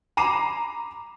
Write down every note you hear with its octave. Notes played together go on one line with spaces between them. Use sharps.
A#5 B5 D6 C7 D#7 E7